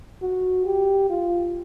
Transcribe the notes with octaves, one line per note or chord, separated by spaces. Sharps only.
F#4
G4
F4